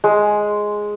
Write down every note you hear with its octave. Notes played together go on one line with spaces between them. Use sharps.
G#3